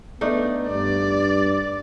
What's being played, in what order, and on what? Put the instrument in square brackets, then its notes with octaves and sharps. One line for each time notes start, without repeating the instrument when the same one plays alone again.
[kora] A3 D4 D#4 [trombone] B3
[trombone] G2 [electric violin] D5